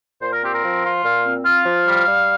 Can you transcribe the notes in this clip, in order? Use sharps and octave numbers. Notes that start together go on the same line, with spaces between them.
A#2 C5
A#4
C4 G4
A#4
F3
F4
A#2 F5
C4
F4 F5
F3
G3
G3